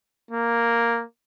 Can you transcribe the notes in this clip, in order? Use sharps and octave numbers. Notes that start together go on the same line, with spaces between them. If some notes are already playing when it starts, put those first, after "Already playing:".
A#3